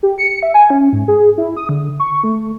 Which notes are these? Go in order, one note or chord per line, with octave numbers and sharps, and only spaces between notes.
G4
C#7
E5
G#5
C#4
G#2
G#4
E4
D#6
D3
C#6
A3